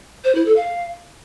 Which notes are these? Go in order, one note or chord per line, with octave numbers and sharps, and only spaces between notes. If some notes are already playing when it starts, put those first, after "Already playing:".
C5
E4
A4
F5